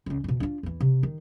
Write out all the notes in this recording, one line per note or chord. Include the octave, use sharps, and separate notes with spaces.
C#2 C#4
F2 B2
D4 F4
E2 E3
C3
D#3